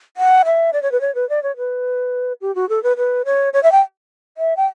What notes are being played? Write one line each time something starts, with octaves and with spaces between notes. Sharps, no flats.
F#5
E5
D5
C#5
B4
C#5
B4
D5
C#5
B4
G4
F#4
A4
B4
B4
C#5
C#5
E5
G5
E5
G5